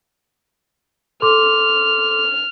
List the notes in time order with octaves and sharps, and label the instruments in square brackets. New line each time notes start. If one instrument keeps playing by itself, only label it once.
[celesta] A4 C6 D6 [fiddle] F6